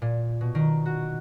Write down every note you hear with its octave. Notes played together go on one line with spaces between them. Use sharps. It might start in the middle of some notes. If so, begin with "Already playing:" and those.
A#2
B2
D#3
F#4